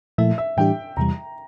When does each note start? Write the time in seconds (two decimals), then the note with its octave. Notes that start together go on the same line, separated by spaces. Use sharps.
0.18 A#2 F3 A3 E4 E5
0.38 E5
0.57 A2 E3 G3 D4 G4 G5
0.97 E2 C3 E3 G3 A#5